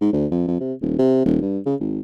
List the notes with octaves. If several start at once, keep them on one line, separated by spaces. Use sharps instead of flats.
G#2
D2
F2
F2
C3
D#1
C3
D#1
G2
C#3
G#1